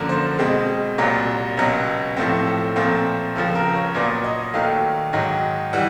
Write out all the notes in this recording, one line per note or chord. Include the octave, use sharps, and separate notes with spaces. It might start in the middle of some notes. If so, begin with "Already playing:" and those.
Already playing: F#2 D3 F3 A#3
C5
B2 G#3 C4
C2 A#2 F#3
C#2 B2 F#3
A2 F3 A3 C4
A4
A#2 F3 A3 C4
C#2 C#3 F3 A4
A#4
C#5
A#2 F#3 B3 D5
D#5
D#2 D#3 F#3 A3 F5
G#2 D#3 F#3
E3 G3 F#5